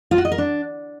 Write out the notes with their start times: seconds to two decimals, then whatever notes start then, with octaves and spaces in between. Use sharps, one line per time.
0.11 F4
0.18 F#4
0.25 D#5
0.32 A#4
0.38 D4